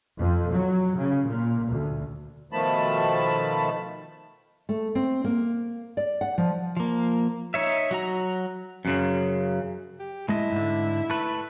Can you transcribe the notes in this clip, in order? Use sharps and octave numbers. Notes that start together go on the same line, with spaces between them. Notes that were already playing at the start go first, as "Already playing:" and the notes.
F2
F#3
C#3
A#2
D2
B2 D#3 F3 A3 A5 B5
A3
C4
A#3
D5
F#5
F3
F3 A#3
D#4 C#5 E5
F#3 F#4 A#5
F#2 C#3
G4
A2 G#3 E4 D#5
G#2 D3
A3 B4